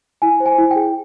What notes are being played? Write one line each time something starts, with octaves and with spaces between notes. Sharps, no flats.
E4 G#5
C5
G#5
E4
G5
G#4